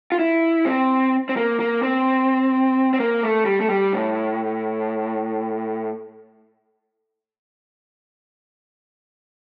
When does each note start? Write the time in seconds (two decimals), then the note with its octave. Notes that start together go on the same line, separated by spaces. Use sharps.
0.12 F4
0.19 E4
0.66 C4
1.29 C4
1.36 A#3
1.60 A#3
1.83 C4
2.94 C4
3.00 A#3
3.23 A3
3.46 G3
3.60 A3
3.70 G3
3.93 A2